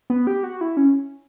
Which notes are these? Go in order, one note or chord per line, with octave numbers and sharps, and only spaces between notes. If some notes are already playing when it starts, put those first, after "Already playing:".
B3
G4
F#4
E4
C#4